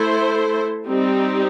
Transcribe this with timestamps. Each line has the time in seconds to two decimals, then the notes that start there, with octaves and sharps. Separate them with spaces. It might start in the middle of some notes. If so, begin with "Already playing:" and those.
Already playing: A3 E4 A4 C5
0.86 G3 C4 D#4 G4